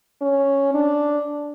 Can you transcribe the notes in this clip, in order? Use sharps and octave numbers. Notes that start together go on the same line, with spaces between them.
C#4
D4